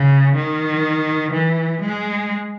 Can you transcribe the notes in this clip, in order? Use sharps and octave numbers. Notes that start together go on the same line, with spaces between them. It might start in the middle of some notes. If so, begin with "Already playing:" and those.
Already playing: C#3
D#3
E3
G#3